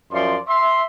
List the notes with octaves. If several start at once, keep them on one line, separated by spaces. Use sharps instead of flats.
F#2 F3 D5 C6
E5 C6